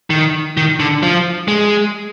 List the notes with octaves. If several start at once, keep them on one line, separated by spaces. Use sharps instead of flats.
D#3
D#3
D3
F3
G#3